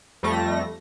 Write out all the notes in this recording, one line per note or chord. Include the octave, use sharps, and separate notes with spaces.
F2 G3 A3 A#6